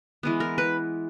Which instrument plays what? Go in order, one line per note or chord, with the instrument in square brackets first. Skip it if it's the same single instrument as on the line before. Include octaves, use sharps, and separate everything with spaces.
[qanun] E3 G#3 B3
A#4
B4